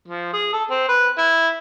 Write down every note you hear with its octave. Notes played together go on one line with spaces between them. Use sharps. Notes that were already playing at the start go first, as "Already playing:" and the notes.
F3
G#4
A4
C4
B4
E4